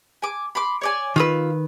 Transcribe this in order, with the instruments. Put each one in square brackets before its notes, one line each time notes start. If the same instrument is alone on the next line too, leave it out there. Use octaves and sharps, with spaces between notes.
[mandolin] G#5 D6
B5 C6 D6
C#5 D5 G#5
[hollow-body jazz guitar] D#3 B4 [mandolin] F4 D#6 E6